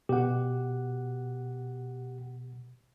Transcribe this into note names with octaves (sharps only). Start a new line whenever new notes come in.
B2 G4 F#5